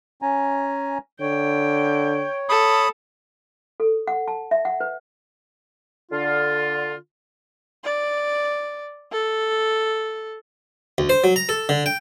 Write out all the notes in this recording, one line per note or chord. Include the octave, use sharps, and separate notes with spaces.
C#4 G#5 A#5
D3 C#5 G5
A4 B5 D#6
A4
F#5
A5
E5
F#5
B4
D3 F4
D5
A4
D2
C5
F#3
A#5
A4
D3
G5